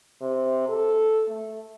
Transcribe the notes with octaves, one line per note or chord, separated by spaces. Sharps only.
C3
A4
A3